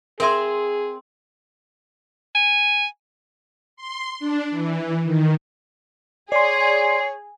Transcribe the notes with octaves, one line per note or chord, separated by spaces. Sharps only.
C4 G#4 A#4 E5 G#5 C6
G#5
C6
D4
E3
D#3
G#4 C#5 D5 C6 C7